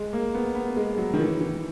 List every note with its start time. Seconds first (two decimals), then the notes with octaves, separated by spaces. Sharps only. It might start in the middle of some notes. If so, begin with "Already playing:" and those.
Already playing: G#3
0.13 A#3
0.35 B3
0.55 B3
0.77 G#3
0.98 F#3
1.14 D#3
1.20 E3
1.41 E3